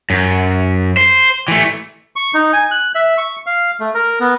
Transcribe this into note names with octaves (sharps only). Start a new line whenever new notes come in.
F#2
C5
E3 A3
C#6
D#4
G#5
F#6
E5
C#6
F5
A3
A#4
B3